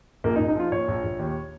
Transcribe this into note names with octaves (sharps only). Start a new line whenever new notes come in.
A#1 A#3
D#4
A#1
D#4
F3 F4
A#2 C#5
A#1
A#1
D#2